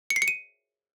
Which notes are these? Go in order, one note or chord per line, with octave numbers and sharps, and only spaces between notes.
C#7
C7
C#7
D#7